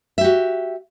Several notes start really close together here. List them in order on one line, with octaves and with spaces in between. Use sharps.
E5 G4 F#4